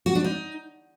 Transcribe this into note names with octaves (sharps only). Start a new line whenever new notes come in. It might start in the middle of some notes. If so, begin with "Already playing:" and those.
F#4
D4
D#4